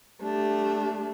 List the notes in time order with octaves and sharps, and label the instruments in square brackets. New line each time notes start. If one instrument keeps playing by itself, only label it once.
[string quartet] A3 D4 [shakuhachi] G4